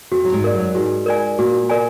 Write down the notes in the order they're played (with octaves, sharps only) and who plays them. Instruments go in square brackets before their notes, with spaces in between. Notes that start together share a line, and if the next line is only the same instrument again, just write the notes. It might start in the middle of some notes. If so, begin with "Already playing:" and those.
[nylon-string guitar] F2 F3 [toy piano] F#4
[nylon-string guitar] F#3
G#2 G#3
[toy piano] A#4 D5
[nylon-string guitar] F#2 F#3
[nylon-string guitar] G#2 G#3 [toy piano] F#4
[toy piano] A#4 D5 G#5
[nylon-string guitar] A#2 A#3 [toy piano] F#4
[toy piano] A#4 D5 G#5